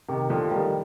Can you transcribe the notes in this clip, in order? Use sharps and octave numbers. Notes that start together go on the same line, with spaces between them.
C3 D#3
D3 F3
D#3 G3